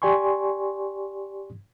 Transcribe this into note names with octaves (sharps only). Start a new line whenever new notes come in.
G4 D5 G#5 C6 C#6